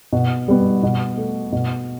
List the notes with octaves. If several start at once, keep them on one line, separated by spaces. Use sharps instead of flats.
B2
G3 B3
B2
A3
B2